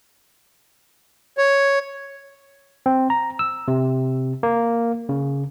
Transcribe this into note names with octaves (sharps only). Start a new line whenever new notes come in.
C#5
C4
A#5
E6
C3
A#3
C#3